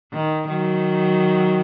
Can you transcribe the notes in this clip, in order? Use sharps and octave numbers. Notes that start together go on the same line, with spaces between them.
D#3
D#3 F#3